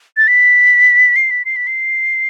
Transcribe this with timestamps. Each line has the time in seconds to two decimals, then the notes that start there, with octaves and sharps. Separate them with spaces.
0.17 A6
0.28 B6
1.16 C7
1.31 B6
1.45 C7
1.56 B6
1.67 C7